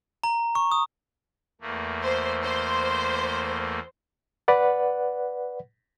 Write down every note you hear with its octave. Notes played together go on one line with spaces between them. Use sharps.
A#5
C#6
D#6
E2 A3 A#3
C5
C5
B4 D5 F#5